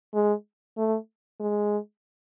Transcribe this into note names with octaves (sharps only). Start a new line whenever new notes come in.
G#3
A3
G#3